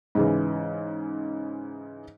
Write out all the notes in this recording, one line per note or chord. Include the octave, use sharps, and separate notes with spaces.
G#2 C#3 E3